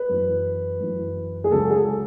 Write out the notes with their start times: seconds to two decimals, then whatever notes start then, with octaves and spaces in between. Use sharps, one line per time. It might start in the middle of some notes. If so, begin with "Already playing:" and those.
Already playing: B4
0.09 F#2 E3
0.80 F#2 E3
1.44 G#4
1.51 C#2 C#3 F#3 A4
1.70 G#4
1.75 A4